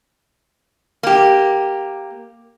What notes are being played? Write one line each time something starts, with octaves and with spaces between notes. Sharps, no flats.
A#3 G4